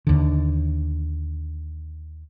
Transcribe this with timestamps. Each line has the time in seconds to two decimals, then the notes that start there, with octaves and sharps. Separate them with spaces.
0.07 D#2 D3